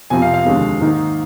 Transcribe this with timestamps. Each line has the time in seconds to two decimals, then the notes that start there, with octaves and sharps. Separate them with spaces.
0.10 F2 C3 F3 C4 G#5
0.22 F5
0.34 F5
0.45 D#2 D3 F3 G#3 C4
0.81 G#2 D#3 A#3 D#4